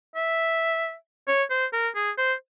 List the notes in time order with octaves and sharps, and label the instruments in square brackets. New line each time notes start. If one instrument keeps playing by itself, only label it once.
[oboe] E5
C#5
C5
A#4
G#4
C5